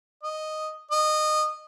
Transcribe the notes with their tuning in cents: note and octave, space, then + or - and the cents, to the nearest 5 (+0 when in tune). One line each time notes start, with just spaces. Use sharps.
D#5 +0
D#5 -20